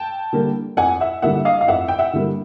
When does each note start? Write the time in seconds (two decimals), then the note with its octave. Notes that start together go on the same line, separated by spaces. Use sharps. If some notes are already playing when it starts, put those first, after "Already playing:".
Already playing: G5 A5
0.33 D3 G3 A#3
0.77 F2 F#5 G#5
1.01 E5 F#5
1.22 D3 G3 A#3 E5 F#5
1.45 D#5 F5
1.61 F5
1.68 F2 E5 F#5
1.88 G5
1.99 E5 F#5
2.13 D3 G3 A#3